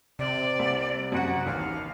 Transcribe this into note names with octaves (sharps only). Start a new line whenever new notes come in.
C3 D5
C2
F#2 F#4 F#5
A1 D#2 F5